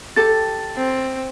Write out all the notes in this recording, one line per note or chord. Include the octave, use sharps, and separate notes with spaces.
G4 A4 A6
C4